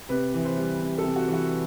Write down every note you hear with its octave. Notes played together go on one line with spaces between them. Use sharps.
C3 B4
E3
C5
G3
C3
A4
C3
F#4
E3
F#4